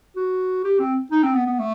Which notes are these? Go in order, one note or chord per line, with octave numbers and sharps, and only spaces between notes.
F#4
G4
C4
D#4
C4
B3
B3
A3